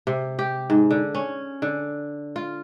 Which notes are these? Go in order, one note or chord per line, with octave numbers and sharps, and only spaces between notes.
C3
G4
G#2
D3
C#4
D3
F4